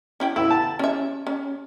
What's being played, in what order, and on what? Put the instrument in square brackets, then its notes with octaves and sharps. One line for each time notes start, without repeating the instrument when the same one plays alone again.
[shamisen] C#4 E4 G5
[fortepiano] E4 [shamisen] B4
[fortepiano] A5
[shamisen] C#4 E5
C#4